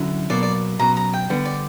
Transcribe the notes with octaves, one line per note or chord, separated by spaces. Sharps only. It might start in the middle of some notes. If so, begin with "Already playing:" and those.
Already playing: D3 F#3 C#4 E4
B2 F#3 A#3 D5
D5
B2 F#3 C#4 A#5
A#5
G5
D3 G3 B3 F#5
D5